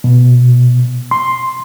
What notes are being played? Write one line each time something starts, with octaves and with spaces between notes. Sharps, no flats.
B2
C6